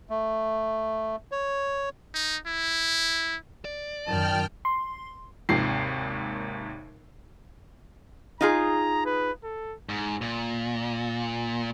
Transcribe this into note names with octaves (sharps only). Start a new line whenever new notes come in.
A3
C#5
D#4
E4
D5
F#2 D#3 G5 A5 F6
C6
G#1 D#2 C3 C7
D#4 F4 G#4 A#5
B4
A4
G#2
A#2